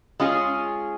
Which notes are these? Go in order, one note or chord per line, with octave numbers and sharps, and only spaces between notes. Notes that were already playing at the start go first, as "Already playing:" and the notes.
G#3 C#4 F4 G#4